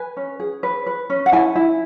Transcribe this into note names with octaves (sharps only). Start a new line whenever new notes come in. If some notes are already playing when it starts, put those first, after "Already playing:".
Already playing: B4 G#5
C#4
G#4
B4
B4
C#4
F#5
E4 G#5
E4